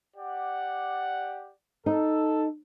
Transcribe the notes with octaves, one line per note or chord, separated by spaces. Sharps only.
G4 D5 F#5
D#4 A4